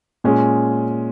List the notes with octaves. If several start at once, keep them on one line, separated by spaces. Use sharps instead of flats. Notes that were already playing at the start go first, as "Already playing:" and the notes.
A#2 G#3 C#4 G#4